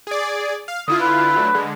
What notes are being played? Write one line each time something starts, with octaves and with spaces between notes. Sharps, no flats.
G#4 D5
F5
D3 E4 F4 D#6
B4
F#3 A3 D4
D3 G#3